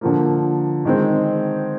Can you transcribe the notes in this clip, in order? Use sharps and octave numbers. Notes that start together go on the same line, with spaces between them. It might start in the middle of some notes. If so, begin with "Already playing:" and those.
D3 F3 A#3
D#3 G#3 C4